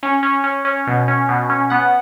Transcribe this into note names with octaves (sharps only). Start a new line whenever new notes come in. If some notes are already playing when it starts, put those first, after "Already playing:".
C#4
C#4
C#4
C#4
B2
C#4
B2
C#4
B3 F#5